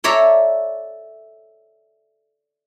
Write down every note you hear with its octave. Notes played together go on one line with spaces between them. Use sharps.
A4 C#5 D5 E5 A#5